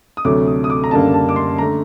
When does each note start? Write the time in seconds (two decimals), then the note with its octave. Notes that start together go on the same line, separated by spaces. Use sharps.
0.17 D#6
0.25 D2 C3 F#3 A3 D6
0.47 D#6
0.64 D#6
0.70 D6
0.84 A#5
0.91 F#1 F#2 D3 G3 A#3 A5
1.14 A5
1.29 D6
1.36 C6
1.58 D3 A3 A#5